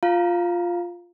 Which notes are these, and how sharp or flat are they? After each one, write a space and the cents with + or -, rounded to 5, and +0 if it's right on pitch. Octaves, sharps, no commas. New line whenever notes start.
F4 +0 F5 +0 A#5 +0